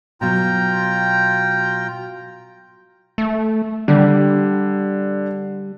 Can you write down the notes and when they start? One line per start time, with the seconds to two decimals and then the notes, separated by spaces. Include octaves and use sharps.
0.21 B2 F#3 F4 G5 A#5
3.18 A3
3.88 D3 G3